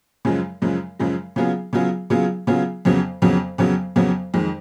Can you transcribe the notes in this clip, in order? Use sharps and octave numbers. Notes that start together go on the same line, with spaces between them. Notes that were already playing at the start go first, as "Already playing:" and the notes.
F#2 C#3 F3 G#3
F#2 C#3 F3 G#3
F#2 C#3 F3 G#3
C#3 F#3 B3 F4 G#4
C#3 F#3 B3 F4 G#4
C#3 F#3 B3 F4 G#4
C#3 F#3 B3 F4 G#4
F2 C#3 F#3 B3
F2 C#3 F#3 B3
F2 C#3 F#3 B3
F2 C#3 F#3 B3
F2 D#3 G#3